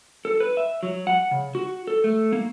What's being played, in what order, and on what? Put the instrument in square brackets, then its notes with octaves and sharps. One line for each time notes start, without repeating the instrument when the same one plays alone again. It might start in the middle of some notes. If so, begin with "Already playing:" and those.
[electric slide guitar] A4
B4
E5
F#3
F#5
C#3
F#4
A4
A3
A#3